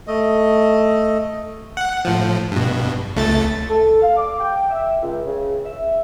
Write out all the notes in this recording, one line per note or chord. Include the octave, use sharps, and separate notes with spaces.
A3 D#5
F#5
A2 F3
G2 B2
C#2 A3 A6
A4
F5
D6
G5
E5
C#2
C#3
E5